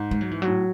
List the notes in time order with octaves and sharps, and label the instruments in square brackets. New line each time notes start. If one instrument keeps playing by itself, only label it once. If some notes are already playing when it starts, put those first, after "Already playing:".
Already playing: [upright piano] G#2
[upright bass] G#3
F#3
E3
F#3
[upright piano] A2